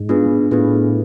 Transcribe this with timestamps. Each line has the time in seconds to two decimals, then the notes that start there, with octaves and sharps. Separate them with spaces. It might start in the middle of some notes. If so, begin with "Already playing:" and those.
Already playing: G#2
0.09 B3 D4 F4 G#4 B4
0.51 A2 B3 D4 F4 G#4 B4